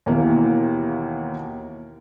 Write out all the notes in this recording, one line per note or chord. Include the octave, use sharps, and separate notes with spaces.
D#2 B2 E3 A#3